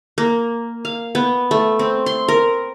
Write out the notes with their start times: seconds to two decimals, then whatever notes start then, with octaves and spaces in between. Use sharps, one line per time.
0.18 A#3
0.85 F5
1.15 B3
1.51 A3
1.79 C4
2.06 C6
2.28 A#4